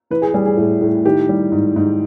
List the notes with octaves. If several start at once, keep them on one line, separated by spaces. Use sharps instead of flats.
E3 B4
G#4
G3 G#4
G#4
A2
A2
D#3 G4
G3
G#2
G#2